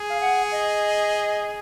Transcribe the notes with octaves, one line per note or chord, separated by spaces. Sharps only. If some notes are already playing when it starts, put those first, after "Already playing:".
Already playing: G#4
F5
F#5
D#5